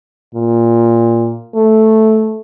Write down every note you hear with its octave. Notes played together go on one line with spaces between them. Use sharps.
A#2
A3